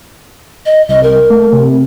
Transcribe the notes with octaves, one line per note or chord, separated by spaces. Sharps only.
D#5
C2 D#5
A#4
A3
C3